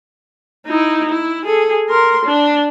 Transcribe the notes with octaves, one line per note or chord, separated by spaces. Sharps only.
D#4 E4
E4
G#4 A4
A#4 C6
D4